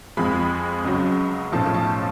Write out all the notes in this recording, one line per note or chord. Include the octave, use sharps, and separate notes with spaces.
F2 F3 G#3 B5
C#2 C#3 F#3
B1 A2 F3 A3 C#4 A5
A5